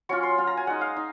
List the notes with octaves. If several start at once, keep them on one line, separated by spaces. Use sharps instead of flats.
F#3 C#4 F4 C#6
C6
F#3 C#4 F4
A#5
G#5
G#3 D#4 F#5
F5
D#4